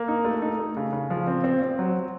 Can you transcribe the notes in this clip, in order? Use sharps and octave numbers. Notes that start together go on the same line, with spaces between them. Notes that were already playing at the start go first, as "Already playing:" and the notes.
Already playing: A#3
D#4
A3
D#4
A3
C#3
C#3
F3
C4
C4
C4
F#3